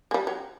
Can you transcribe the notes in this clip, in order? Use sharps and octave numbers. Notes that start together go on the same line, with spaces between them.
G#3
G3
F#3